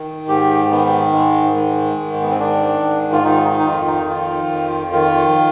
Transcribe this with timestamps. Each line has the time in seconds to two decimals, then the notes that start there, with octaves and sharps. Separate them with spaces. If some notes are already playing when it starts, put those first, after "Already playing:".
Already playing: D#3
0.28 G#2 G4
0.70 D#3 B3
1.13 G#2 G#3
1.55 D#3 G#3
1.97 G#2
2.13 G#3
2.22 B3
2.31 C4
2.39 D#3 D4
2.81 G#2
3.12 F4
3.24 D#3 D#4
3.45 D#4
3.59 D#4
3.66 F2 F4
3.87 D#4
4.08 D#3 F4
4.50 F2
4.93 D#3 F4